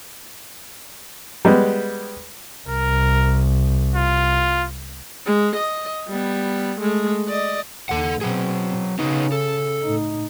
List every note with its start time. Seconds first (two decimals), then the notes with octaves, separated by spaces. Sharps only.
1.45 G3 G#3 B3
2.68 C2 A#4
3.94 F4
5.26 G#3
5.55 D#5
6.08 G3 B3
6.80 G#3 A3
7.28 D5 D#5
7.89 D#2 A4 F#5
8.21 B2 F#3 C4 G#4
8.99 C#3 B3 D#4
9.32 A4
9.82 A2 D#4